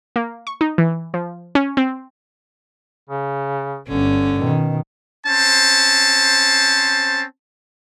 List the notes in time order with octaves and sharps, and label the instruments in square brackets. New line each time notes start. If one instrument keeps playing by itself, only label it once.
[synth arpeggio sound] A#3
C#6
D#4
E3
F3
C#4
C4
[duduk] C#3
[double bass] G1 [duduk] D3 [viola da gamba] C#4
[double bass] B2 D#3
[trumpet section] C4 C#4 C5 A5